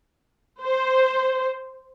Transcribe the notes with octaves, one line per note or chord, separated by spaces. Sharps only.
C5